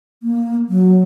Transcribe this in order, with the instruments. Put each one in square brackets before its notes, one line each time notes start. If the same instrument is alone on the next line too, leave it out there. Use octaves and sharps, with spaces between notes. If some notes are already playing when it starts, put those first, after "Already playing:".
[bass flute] A#3
F#3